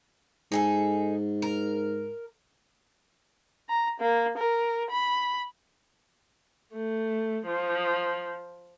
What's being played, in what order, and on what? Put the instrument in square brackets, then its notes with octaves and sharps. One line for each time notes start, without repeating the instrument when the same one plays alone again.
[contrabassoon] G#2 [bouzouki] D#4 G#4 A4
[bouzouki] A#4
[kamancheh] A#5
A#3
A#4
B5
[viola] A3
F3